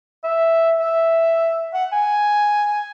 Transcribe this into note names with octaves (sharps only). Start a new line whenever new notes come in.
E5
E5
F#5
G#5